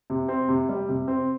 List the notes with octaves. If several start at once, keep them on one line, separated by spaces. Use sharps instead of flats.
C3
C4
C3
G3
C3
C4